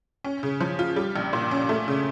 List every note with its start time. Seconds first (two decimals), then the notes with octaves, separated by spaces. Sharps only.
0.24 C#4
0.43 C#3
0.61 F3
0.79 F4
0.96 G3
1.16 A#1
1.33 A#2
1.51 C#4
1.69 A3
1.88 C#3